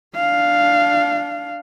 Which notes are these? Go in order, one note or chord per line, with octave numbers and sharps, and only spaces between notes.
D4 F5